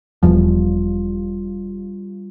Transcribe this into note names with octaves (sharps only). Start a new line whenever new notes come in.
E1 E2 F3 G3 F4